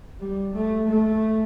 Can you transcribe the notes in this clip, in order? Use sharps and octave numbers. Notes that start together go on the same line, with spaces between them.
G3
A3
A3